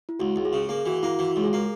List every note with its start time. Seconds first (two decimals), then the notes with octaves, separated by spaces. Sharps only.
0.09 E4
0.19 C#2 F#4
0.36 C#2
0.45 G#4
0.53 C#3
0.69 A#3 G#4
0.86 E3 F#4
1.03 A#3 E4
1.19 E3 F#4
1.36 C#2
1.44 G#4
1.53 A#3